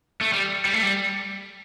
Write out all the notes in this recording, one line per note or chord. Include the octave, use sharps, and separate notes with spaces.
A3
G3
G3
A3
G3